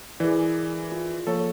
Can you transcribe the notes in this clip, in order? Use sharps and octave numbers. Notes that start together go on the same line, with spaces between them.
E3 G#4 A#4 D5
F4
F3 A#3 A4 C#5